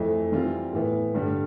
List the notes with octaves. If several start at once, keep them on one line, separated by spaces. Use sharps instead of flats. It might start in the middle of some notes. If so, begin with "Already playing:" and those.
Already playing: F2 E3 A3
E3 G3 C4 F4
A2 E3 B3
G2 D3 G3